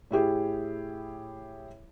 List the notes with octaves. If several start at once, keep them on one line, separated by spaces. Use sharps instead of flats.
A2 E4 G4 G#4